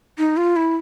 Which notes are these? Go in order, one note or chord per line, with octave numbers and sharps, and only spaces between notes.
D#4
F4
E4